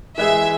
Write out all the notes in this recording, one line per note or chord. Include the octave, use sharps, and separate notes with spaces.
E3 G#3 E4 G#4 E5